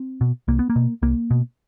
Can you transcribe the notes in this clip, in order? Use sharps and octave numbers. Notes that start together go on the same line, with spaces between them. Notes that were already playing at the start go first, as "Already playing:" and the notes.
Already playing: C4
B2
C2 A#3
B3
A#3
B2
C2 A#3
B2